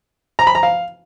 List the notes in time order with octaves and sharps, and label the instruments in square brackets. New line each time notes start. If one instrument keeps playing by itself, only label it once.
[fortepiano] A#5
B5
A#5
F5